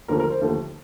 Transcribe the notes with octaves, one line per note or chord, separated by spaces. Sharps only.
D#2 D3 F3 A3 A#4
A#4
C5
D#2 D3 F3 A3